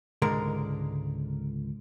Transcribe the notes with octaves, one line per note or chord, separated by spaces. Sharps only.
C#2 G#2 D3 G#3 A#4